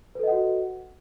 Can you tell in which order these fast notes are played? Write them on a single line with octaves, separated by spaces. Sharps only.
B4 A4 D#5 F#5 F#4